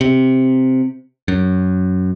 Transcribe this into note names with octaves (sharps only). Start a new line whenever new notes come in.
C3
F#2